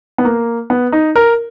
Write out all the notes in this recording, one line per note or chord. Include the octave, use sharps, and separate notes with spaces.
B3
A#3
B3
D#4
A#4